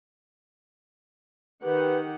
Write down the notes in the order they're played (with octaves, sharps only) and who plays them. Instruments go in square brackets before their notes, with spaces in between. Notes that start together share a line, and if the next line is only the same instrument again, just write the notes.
[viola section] D#3 G4 F#5 [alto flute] B4